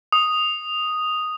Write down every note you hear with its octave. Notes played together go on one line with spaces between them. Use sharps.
D#6